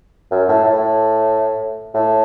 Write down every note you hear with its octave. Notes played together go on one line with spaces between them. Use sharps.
F#2
A2
A2
A2